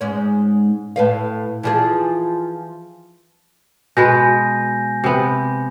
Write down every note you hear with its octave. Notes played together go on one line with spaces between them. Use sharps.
G#2 G#3 C#4
A2 B4 F5
E3 F3 G#4
B2 G#3 B4 G#5 G6 A#6
C3 B3